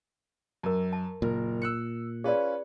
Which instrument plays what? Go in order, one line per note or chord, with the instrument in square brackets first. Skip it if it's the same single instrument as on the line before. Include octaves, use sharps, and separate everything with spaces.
[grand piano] F#2 [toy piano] A#4 A5
[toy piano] A5
[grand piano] F#1 A#4 [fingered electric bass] A#2
[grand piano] E6 F#6 C#7
[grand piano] C#4 F4 B4 [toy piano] G#4 D5